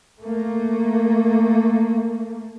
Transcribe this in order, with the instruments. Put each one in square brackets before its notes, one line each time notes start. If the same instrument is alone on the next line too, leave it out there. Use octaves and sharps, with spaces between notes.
[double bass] A3 A#3